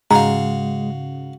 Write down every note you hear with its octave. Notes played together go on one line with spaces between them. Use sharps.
G#2 C#3 G#3 F#4 F5 A#5